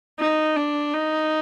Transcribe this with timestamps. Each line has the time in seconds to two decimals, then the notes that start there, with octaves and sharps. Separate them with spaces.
0.20 D#4
0.56 D4
0.94 D#4